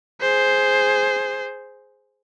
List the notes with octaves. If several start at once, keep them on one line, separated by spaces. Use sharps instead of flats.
G#4 C5